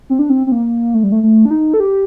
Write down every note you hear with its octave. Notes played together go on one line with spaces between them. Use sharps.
C4
D4
C4
C4
A#3
A3
G3
A3
A3
D4
D#4
A4
G4